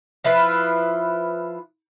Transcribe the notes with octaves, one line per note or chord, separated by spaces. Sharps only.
F3 E4 F4 B4